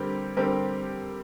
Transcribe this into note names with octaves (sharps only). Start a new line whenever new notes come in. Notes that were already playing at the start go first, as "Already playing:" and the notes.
Already playing: D3 G3 C4 G4 A#4
D3 G3 C4 G4 A#4